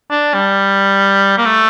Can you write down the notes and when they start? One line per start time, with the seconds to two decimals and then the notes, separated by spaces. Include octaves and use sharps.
0.11 D4
0.34 G3
1.38 A#3
1.46 A3